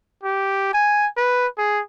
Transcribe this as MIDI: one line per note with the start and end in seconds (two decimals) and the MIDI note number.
0.23 0.72 67
0.73 1.07 80
1.17 1.47 71
1.58 1.81 68